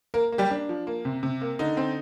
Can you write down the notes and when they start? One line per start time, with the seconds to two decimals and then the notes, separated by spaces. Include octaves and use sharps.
0.14 A#3 A#4
0.32 A#3
0.38 G3 G4
0.51 D4
0.69 F3
0.87 A#3
1.05 C3
1.23 C3
1.41 A#3
1.59 D3 D#4
1.77 C4